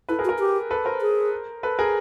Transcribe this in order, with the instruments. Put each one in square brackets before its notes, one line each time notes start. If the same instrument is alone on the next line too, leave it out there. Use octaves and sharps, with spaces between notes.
[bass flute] E4 [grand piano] A4 B4
[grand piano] G#4 A#4
[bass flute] F#4
[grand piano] G#4 A#4
[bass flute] G4
[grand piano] A4 B4
A#4 C5
[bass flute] G#4
[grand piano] A4 B4
G#4 A#4